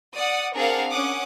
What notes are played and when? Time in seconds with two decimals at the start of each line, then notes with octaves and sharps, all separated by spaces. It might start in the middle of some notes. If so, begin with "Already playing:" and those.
0.14 D5 F#5 D#6
0.54 C4 D4 G#4 A#4 F5 F#5
0.90 C#4 F#5 D6 D#6